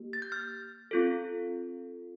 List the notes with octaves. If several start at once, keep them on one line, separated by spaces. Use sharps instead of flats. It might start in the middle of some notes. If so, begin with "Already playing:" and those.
Already playing: A#3 G4
A6
G6
F6 A6
C4 F4 A4